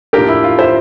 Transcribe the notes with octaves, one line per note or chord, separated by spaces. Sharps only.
A2 F3 A#3 D4 G4 A#4
E4
F4
C5 E5